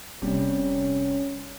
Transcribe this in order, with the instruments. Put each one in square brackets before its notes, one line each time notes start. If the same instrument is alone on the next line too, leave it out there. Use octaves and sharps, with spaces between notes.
[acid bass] F1 [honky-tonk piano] C3 [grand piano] G3 [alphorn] C#4